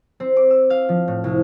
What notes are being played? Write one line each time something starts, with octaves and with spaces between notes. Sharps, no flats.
C4
D6
E6
F5
F3
A2
C2